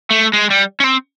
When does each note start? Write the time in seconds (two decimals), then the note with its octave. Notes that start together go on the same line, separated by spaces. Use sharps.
0.11 A3
0.33 G#3
0.51 G3
0.80 C#4
0.84 C4